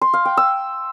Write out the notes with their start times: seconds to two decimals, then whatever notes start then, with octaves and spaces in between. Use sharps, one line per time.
0.01 C6
0.13 F5
0.25 G5
0.37 E6